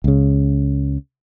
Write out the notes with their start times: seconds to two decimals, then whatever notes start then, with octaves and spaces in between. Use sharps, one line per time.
0.04 C#2 C#3